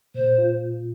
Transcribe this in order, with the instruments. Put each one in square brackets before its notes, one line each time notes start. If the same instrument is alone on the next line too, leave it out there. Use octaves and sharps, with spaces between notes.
[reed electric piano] A#2 [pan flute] C5
[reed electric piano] F4